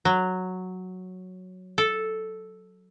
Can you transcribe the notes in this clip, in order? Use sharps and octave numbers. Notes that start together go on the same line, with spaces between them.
F#3
A4